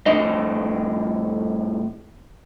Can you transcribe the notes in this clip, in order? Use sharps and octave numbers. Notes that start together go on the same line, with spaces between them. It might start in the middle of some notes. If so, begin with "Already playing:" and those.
F2 A2 D4 D#5